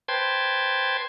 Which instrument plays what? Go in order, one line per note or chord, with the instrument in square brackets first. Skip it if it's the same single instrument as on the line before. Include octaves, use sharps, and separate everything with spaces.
[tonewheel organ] B4 C5 G5 A5 C6 G#6